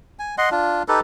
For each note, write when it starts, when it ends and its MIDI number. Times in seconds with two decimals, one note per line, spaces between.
0.19 0.35 80
0.38 0.49 75
0.38 0.49 78
0.38 0.49 84
0.51 0.83 62
0.51 0.83 65
0.88 1.00 63
0.88 1.00 67
0.88 1.00 69
0.88 1.00 71